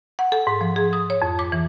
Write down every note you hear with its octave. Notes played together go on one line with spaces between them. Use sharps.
F#5
A4
G#2
F3
G#4
D#6
C#5
F2
D6
E3